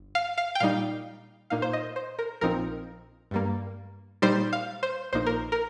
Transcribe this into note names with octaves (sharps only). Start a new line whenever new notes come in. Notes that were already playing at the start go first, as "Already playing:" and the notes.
Already playing: G1
F5
F5
G5
A#2 G3 D#4 F5
A#2 A#3 D#4 F5
C5
D#5
C5
A#4
A#1 A#2 F3 C4 D#4 A#4
G2 G3 A#3
A#2 G3 D#4 C5
F5
C5
A#1 A#2 A#3 D#4 C5
A#4
A#4